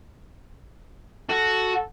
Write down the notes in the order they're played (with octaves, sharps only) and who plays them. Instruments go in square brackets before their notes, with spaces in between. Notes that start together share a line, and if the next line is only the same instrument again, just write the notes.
[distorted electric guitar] F#4 [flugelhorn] A4